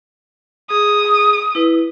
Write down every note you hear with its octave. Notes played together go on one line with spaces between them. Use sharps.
G#4 D#6
E4 B4